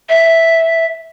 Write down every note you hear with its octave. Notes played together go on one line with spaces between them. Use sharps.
E5